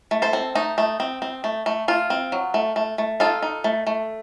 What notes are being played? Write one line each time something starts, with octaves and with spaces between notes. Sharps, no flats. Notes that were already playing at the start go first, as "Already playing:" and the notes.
A3
A4 C5
C4
A3 D#4
A3
C4
C4
A3
A3
A3 F4
C4
F#3
A3
A3
A3
D#4 F4 A4
D#4
A3
A3